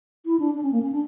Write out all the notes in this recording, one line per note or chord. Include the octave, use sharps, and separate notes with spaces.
E4
D4
D4
C#4
A#3
C#4
D4